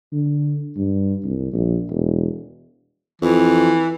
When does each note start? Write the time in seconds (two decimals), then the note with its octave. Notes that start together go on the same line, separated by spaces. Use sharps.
0.12 D3
0.77 G2
1.24 C2
1.53 A#1
1.90 E1
3.22 F2 E3